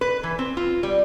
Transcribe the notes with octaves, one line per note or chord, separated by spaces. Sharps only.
B4
E3
C4
F4
G3